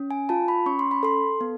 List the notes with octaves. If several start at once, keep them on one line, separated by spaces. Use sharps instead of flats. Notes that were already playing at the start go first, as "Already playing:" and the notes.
Already playing: C#4
G#5
F4 A5
B5
C#4 C#6
C6
B5
A4 C6
B3